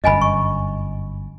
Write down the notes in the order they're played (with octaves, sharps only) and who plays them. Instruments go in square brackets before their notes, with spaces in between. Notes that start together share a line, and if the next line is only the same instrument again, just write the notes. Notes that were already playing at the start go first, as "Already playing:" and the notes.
[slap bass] G1 F#2 [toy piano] D#5 G#5 B5
[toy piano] C#6